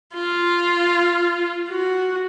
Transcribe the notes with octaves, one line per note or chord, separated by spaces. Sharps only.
F4
F#4